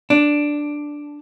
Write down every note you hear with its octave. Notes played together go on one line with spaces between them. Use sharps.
D4